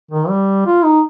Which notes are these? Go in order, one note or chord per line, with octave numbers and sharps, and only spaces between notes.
D#3
G3
F4
D#4